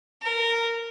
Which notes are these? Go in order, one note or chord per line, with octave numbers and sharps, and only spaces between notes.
A#4